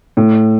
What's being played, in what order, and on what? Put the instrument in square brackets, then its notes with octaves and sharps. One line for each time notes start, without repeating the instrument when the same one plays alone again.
[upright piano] A2